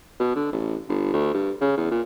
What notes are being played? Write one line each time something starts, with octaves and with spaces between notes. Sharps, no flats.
B2
D3
A1
G1
D2
G2
C#3
E2
A#2